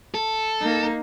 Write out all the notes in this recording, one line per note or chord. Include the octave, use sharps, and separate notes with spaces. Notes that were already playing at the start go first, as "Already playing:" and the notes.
A4
A#3 D#4